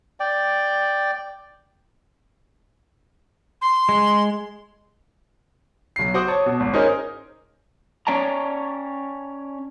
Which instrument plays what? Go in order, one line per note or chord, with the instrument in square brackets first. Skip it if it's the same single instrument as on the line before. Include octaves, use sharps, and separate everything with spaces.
[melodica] D5 G5
[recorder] C6
[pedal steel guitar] G#3
[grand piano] B1 C7
F#4 C5 F#5 D6 D#6
C#5 A5 D#6
B2
G#1
C#4 D#4 G#4 A#4 C5 D#5
[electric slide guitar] C#4 C#5 D5 G5 A5 A#5